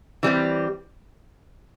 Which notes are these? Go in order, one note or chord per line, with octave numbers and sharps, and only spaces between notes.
E3 G3 C4 G4